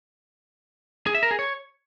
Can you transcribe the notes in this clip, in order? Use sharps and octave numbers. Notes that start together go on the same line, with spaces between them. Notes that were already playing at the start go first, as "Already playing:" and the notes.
G#4
E5
A#4
G#4
C#5